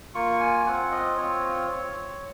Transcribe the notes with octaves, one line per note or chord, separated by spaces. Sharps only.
A#3 F4 C#6
G#5
C4 F4 F#5
D#5
C4 F4 C#5